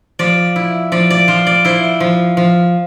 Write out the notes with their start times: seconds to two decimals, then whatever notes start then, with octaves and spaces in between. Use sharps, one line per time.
0.19 F3 D5
0.56 E4
0.92 F3 D5
1.10 D5
1.28 F3 C5
1.47 D5
1.65 E4 C5
2.00 F3
2.37 F3